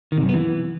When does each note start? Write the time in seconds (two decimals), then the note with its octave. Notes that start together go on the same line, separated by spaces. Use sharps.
0.12 D#3
0.17 C3
0.23 F#2
0.28 B3
0.34 E3